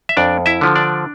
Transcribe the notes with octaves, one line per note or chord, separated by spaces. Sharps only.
E5
F2 D4 D5
E4 E5
D3 F3
D4 D5